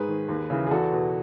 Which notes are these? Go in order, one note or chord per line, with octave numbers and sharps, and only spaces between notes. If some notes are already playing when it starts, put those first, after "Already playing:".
Already playing: G#2 G#4 B4
D#3
D#2
C#3 E3
G#4
E2 F#4 A4
B2